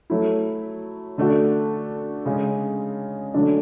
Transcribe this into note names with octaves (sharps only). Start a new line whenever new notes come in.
F#3 A3 E4
D3 A3 D4 F#4 A4
C#3 G#3 C#4
D3 F#3 A3 D4